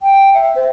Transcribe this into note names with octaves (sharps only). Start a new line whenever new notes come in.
G5
E5
C5